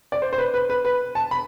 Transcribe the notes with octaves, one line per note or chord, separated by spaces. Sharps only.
D5
C5
C5
B4
B4
B4
B4
A5
B5